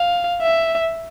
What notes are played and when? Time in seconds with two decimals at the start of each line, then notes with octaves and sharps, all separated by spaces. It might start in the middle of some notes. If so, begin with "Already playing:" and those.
Already playing: F5
0.42 E5